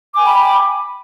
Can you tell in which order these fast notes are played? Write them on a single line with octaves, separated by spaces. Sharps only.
D6 G#5 G5 B5